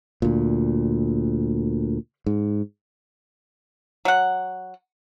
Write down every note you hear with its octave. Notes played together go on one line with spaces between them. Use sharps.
D2 A#2
G#2
F#3 F#5